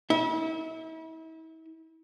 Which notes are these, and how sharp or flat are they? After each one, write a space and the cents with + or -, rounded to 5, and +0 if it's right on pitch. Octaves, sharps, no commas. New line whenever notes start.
E4 -40 E5 -25